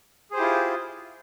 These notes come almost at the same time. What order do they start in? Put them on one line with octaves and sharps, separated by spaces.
G#4 C5 G4 E4 F4